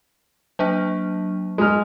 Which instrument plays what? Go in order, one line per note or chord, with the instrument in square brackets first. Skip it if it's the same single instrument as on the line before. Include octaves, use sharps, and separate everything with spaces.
[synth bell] F#3 A#3 D4
[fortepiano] G#3 F6